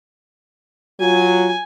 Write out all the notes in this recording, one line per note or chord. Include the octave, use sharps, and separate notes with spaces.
F#3 F4 G#5